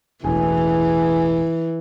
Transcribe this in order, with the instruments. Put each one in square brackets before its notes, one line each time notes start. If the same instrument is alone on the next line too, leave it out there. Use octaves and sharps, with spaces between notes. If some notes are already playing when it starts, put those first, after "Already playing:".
[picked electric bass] E1 A1 [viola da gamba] E3 [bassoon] G#4